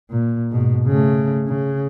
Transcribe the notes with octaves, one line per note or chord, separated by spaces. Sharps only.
A#2
G#2 B2
C#3 A3
C#3